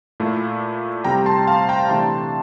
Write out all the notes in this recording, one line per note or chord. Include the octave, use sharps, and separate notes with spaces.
A#2 A3 E4
C3 G3 C4 G5 A#5
A5 C6
F5 A5
G5 A#5
C3 E3 A3 D4 A5 C6